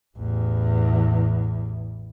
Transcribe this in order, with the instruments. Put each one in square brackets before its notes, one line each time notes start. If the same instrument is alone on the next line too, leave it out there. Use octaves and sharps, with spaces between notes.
[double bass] A1 E2